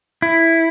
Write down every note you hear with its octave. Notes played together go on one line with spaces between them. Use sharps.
E4